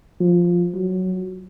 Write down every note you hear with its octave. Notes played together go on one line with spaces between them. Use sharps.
F3
F#3